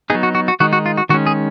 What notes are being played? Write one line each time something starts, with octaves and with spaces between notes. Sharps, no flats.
F#3 B3 D#4 G#4
F#4
F#4
F#4
D#3 G#3 D#4 F#4
F#4
F4
F#4
D#3 G#3 C#4 F#4
G#4